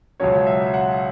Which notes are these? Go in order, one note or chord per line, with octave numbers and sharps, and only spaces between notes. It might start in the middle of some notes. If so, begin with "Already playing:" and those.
C#2 B2 F#3 C#4 C#5
E5
F#5